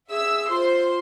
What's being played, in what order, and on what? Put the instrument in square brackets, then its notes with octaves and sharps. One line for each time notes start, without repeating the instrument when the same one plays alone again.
[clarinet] G#4 [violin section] E5 E6
[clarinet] F4 [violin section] C5 C6